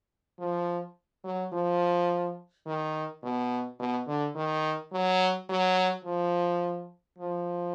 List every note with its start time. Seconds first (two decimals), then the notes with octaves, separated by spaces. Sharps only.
0.39 F3
1.24 F#3
1.53 F3
2.66 D#3
3.23 B2
3.80 B2
4.07 D3
4.35 D#3
4.92 F#3
5.50 F#3
6.05 F3
7.19 F3